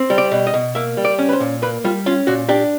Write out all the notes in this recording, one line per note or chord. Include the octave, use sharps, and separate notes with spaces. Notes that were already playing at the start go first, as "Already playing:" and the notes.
Already playing: C4
G3
D5
B2
D#5
B2
A#3 E5
G3
D5
C#4
B4
C5
A#2
A#3 B4
G3 F4
C#4 F4
A#2 F#4
D4 G4